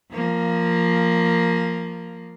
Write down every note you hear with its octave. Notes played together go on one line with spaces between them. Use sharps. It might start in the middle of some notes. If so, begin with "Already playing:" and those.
F3 A#3